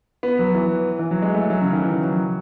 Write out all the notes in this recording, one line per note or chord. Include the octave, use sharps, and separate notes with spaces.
B3
F#3
E3
E3
F#3
G#3
A3
F#3
C#3
D#3
E3
F#3